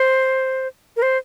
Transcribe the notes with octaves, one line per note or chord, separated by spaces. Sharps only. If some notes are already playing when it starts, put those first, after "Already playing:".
Already playing: C5
A#4
C5